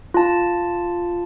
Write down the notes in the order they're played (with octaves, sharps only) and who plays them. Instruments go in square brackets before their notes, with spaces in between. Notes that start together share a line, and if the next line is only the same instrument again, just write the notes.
[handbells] F4 A5